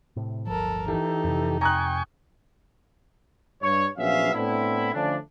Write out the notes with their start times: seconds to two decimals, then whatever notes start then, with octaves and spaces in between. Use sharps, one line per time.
0.16 A2 C3
0.47 D1 G1 F3 A4 A#4
0.88 E3 D#4 G4 A4
1.24 F2 C3
1.61 G5 G#5 A#5 C#6 D#6 F#6
3.62 G2 C#5
3.97 A#1 F#3 B3 C#4 E5 F5
4.34 A2 B3 C4 D4 E4
4.93 D3 F3 A3 C#4 D4